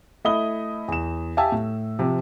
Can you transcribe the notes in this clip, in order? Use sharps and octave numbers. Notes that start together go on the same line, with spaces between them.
A3 E4 D#5 B5 D#6 G7
E2 E7
G4 E5 F5 G#5 A5 E6
A2
C3 F3